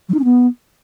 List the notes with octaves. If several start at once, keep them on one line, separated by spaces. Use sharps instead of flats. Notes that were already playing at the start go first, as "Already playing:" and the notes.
F#3
D#4
C#4
B3